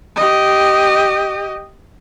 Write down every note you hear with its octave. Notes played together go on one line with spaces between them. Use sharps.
G4 D#5